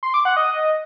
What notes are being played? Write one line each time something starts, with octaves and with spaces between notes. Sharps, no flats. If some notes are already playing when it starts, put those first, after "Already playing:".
C6
D6
F#5
D#5